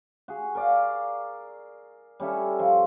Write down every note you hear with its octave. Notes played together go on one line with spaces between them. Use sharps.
F#4 G#4
A#4 D5 F5
G3 C#4 E4 A4
F3